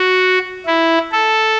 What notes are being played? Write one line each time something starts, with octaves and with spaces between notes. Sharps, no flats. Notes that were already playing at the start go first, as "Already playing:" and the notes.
Already playing: F#4
E4
A4